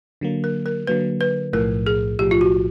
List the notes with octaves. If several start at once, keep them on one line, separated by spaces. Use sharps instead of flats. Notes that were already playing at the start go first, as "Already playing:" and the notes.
D3 F#3 A#3
A#4
A#4
D3 F#3 A#3 B4
B4
B1 A2 F3 A#4
G#4
B1 A2 F3 G4
F4
F#4